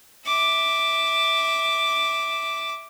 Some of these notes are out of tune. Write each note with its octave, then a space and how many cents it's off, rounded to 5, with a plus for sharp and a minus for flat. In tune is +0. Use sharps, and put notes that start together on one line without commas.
E5 -10 D6 +0